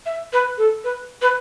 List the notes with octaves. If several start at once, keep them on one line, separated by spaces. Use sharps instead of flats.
E5
B4
A4
B4
B4